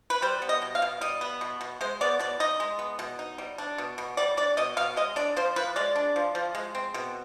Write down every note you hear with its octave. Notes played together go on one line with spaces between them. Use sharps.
B4
G3 C5
B3
D#5
B2
F5
B2
G3 D#5
B3
B2
B2
G#3 C5
B3 D5
B2 D5
D#4 D#5
G#3
B3
B2
D#4
G3
D4
B2
B2
G3 D5
D4 D5
B2 D#5
B2 F5
G#3 D#5
D4 D5
F3 C5
F3 B4
G#3 D5
D4
F3
F3
G#3
C4
B2